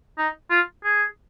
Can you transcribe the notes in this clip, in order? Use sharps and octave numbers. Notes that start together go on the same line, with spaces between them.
D#4
F4
G#4